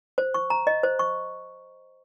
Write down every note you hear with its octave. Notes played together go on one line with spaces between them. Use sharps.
C5
C#6
A#5
D#5
C5
C#6